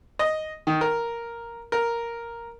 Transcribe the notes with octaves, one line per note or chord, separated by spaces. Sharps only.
D#5
D#3
A#4
A#4